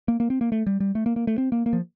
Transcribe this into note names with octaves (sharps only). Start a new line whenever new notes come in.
A#3
A#3
C4
A#3
A3
G3
G3
A3
A#3
A#3
A3
C4
A#3
A#3
F3